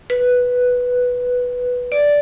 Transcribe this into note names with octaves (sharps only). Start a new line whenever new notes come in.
B4
D5